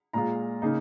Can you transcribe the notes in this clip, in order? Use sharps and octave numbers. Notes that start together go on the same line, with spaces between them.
A#2 G#3 F4 A#5
C#3 A#3 D#4